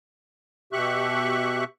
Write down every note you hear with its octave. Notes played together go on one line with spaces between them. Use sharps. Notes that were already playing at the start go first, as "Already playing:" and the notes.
B2 G4 E5 C#6 F#6